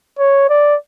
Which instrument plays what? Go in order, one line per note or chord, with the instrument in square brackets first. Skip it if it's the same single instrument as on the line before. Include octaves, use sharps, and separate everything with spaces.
[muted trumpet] C#5
D5